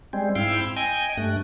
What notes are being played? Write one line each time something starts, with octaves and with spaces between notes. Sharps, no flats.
G3 G#3 C4
G#2 C4 E4 F5 G5 E6
D#5 G5 G#5
G2 A3 F#6